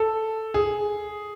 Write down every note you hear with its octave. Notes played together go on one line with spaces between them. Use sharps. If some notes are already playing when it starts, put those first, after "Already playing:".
Already playing: A4
G#4